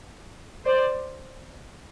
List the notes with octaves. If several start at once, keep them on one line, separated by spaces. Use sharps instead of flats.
C5 D5